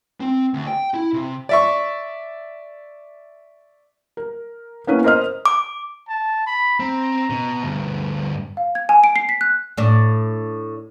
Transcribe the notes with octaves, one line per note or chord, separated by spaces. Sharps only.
C4
D2
G5
E4
C3
D5 E5 C#6
A#4
A#3 B3 C#4 E4 B4
A#4 C5 D#5 F6
D6
A5
B5
C4 A#5
B2
D2 G2
F5
G#6
G#5
D7
C7
B6
F#6
A2 D4